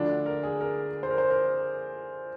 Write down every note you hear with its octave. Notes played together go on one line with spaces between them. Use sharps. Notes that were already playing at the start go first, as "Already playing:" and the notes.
Already playing: D2 D3 F3 D4
A#4
G#4
A#4
C5
A#4
C5
A#4